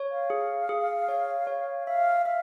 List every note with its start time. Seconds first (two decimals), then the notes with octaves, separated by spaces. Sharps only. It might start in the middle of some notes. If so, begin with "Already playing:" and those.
Already playing: C#5
0.11 F5
0.30 G#4
0.69 G#4
1.08 C#5
1.47 C#5
1.87 E5 F5
2.25 E5 F5